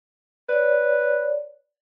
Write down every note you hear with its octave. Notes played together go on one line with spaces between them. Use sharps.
B4 C#5 D5